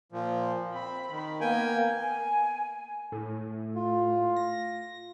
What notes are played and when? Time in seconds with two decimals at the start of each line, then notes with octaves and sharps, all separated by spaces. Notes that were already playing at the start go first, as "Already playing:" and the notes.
0.12 A#2 F3
0.74 C4 B5
1.10 D#3
1.41 A#3 B3 G5 G#5
2.01 G#5
3.12 A2
3.75 F4
4.36 A#6